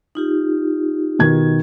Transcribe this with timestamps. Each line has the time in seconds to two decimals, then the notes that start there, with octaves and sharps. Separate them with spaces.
0.15 D#4 F4 G4
1.19 B2 D#3 G#6